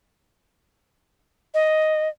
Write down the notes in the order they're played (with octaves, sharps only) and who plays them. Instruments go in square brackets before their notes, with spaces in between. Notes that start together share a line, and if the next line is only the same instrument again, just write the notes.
[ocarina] D#5